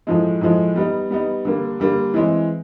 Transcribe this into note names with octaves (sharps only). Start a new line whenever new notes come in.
A2 F3 G#3
A2 F3 G#3
G3 B3 D#4
G3 B3 D#4
D3 G3 A#3
D3 G3 A#3
E3 G#3 C4